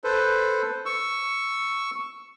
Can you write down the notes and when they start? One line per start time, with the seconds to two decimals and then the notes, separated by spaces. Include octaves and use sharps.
0.04 A4 B4 C5
0.86 C#6 E6